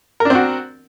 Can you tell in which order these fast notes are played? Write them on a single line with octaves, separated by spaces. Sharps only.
A#4 D4 C4 F#4